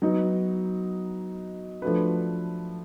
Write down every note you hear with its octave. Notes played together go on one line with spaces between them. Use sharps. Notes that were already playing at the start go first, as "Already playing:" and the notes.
F#3 B3 D#4
F3 A3 D4 F#4 B4